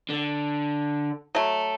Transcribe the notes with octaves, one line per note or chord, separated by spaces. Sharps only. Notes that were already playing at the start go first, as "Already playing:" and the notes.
D3
F#3 A3